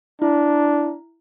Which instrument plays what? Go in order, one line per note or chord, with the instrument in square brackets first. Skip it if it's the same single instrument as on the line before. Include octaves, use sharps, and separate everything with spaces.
[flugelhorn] D4 [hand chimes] E4